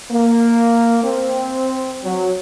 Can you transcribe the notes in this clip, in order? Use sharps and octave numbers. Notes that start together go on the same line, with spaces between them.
A#3
C4
F#3